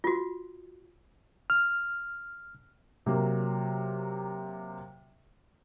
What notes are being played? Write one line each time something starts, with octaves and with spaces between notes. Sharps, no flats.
F4 F#4
F6
C3 F#3 A#3